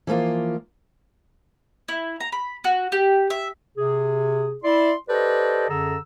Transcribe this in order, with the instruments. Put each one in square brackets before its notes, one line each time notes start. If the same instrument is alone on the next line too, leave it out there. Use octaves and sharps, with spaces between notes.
[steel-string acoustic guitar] E3 F3 A#3 F4
[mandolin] E4
A#5
B5
F#4
G4
E5
[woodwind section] C3 G#4
E4 D5 C6
G4 A4 B4 C5 D5 D#5
F#2 D3 G#4 A4 A#5 E6